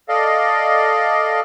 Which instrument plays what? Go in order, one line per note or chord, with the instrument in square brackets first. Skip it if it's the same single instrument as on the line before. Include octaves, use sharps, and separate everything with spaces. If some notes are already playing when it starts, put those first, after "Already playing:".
[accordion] A4 D5 D#5 F5